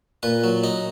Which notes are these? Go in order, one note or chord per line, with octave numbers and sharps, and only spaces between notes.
A#2 B4
F#3
D#4